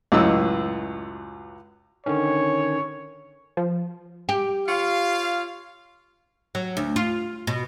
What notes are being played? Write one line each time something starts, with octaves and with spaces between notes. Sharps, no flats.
C#2 F#2 A2 D#5 E6
D3 D#3 C#4 C#5
F3
G4
F4 C#5 F5 C#7
F#3
D2
F4
B2